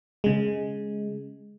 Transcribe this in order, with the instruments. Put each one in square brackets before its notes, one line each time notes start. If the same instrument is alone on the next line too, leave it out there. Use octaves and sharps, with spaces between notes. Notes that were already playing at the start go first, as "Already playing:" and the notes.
[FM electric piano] C#3 G#3